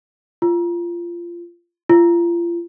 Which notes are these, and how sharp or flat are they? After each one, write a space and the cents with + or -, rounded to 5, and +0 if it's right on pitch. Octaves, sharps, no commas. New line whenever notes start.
F4 -20
F4 -35